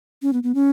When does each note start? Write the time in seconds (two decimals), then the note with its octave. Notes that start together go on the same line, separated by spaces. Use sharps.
0.22 C#4
0.33 B3
0.43 B3
0.55 C#4